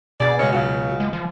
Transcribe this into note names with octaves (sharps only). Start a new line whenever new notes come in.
B2 G#4 D5 A6
C#3 G#3 C#5
C#2 C#3 F#3
G#3
F3